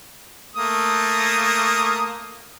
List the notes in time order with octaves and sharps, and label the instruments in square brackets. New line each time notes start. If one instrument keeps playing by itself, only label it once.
[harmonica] A3 A#3 D#6